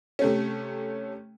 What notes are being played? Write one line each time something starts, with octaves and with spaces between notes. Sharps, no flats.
C3 A3 C#4